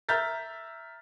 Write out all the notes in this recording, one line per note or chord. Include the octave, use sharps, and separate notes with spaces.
E5 A#5 F6 G6 A6 B6